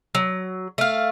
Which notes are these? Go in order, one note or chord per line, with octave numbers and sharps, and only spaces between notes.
F#3
A3 F5